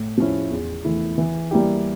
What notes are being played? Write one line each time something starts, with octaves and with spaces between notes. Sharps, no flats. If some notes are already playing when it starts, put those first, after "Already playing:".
Already playing: A2
F3 C#4 E4
E2
E3 A3 E4
E3
G3 A#3 E4 G4